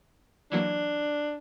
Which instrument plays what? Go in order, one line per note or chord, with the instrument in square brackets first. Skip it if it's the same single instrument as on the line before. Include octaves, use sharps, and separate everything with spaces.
[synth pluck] E3 F#3 A#3 [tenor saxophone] D4